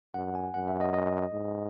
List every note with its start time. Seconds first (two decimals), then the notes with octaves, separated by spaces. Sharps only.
0.14 F#2 F#5
0.35 G#5
0.54 F#2 F#5
0.68 E5
0.81 D#5
0.94 D#5
1.32 G#2